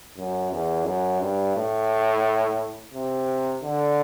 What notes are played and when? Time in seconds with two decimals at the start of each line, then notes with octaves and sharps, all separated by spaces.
0.17 F#2
0.52 E2
0.86 F#2
1.21 G2
1.56 A2
2.94 C3
3.62 D3